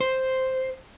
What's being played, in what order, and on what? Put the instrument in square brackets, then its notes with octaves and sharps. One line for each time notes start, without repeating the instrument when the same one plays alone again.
[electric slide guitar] C5